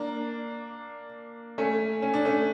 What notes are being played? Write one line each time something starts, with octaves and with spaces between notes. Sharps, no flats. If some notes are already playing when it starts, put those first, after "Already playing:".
Already playing: A#3 D4
A3 C#4
C#4
D4
A3 C#4